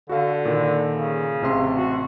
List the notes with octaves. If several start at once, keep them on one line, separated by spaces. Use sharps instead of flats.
D3 F#4 A4 F5
A#2 D#3
C#3
A1 C3 C6
F#4